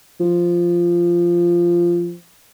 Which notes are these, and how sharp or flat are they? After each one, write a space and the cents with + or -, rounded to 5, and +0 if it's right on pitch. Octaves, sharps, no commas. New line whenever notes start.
F3 -10